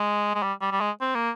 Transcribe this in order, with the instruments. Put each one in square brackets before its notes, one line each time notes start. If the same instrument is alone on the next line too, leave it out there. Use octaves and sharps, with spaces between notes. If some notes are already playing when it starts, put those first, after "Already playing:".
Already playing: [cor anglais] G#3
G#3
G3
G3
G3
G#3
C4
A#3